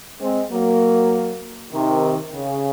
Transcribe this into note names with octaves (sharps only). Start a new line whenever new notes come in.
G#3 C4
F#3 A#3
C3 D#3
C#3